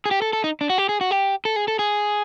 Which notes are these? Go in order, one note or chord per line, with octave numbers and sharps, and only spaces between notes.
G#4
G4
A4
A4
D#4
D4
F#4
G4
G#4
F#4
G4
A4
G#4
A4
G#4